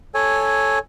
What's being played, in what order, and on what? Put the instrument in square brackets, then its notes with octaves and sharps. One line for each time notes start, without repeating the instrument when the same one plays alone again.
[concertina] A4 C#5 G#5